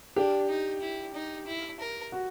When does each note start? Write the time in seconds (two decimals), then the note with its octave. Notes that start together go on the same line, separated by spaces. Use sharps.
0.16 D4 G4
0.49 D#4
0.81 E4
1.14 D#4
1.46 E4
1.80 A#4
2.12 F#4